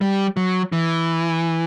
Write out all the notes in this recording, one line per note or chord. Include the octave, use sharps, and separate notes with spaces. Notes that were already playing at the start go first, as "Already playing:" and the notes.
G3
F#3
E3